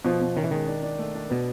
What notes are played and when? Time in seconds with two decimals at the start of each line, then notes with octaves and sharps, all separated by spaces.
0.05 B2 F3
0.21 B2
0.36 D#3 C#4
0.44 E3
0.51 D#3 G#3
0.67 D4
0.83 D4
0.99 A3
1.15 D4
1.30 B2 B3